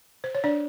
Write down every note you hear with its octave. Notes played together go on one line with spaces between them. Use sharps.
C5
C#5
D4 D5